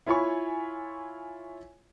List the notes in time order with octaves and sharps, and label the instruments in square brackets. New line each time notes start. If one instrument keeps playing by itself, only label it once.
[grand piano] E4 F4 C#5 G#5 B5 C#6